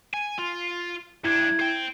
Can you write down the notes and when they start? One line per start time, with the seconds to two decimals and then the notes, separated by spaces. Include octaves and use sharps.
0.14 G#5
0.38 F4
1.24 G2 D4 E4 G#6
1.60 C5 G5